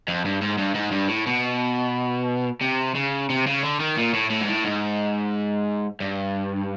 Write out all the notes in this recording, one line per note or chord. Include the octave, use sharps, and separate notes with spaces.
F2
G2
G#2
G2
G#2
G2
A2
B2
C3
C#3
C3
C#3
D3
D#3
A#2
A2
A2
G#2
A2
G#2
G2